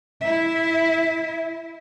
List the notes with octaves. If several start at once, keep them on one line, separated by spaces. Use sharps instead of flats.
E4 E5